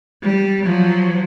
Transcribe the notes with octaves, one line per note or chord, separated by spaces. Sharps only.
G3
F3 F#3